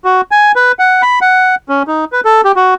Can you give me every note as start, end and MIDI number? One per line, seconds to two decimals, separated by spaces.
0.04 0.21 66
0.31 0.52 80
0.56 0.72 71
0.79 1.02 78
1.02 1.19 83
1.21 1.55 78
1.69 1.83 61
1.87 2.05 63
2.12 2.21 71
2.25 2.41 69
2.45 2.52 67
2.56 2.74 66